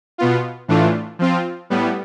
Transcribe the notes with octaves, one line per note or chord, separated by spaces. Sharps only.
B2 B3 F4
A2 E3 A3 D4 F4
F3 C4 F4
A2 G3 B3